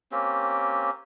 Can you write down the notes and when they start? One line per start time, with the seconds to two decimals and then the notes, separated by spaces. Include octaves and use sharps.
0.12 A#3 C4 C#4 G4